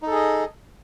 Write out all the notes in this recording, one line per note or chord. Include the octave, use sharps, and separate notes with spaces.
D#4 G#4 A4 D#5